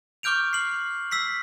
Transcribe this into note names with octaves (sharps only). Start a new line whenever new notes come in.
C#6 D6 F6 G6 D7 F7
C7 F#7
E6 B6 C7